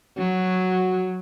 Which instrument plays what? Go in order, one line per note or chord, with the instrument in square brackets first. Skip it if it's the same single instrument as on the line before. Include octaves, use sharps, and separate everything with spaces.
[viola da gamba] F#3 [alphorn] F#4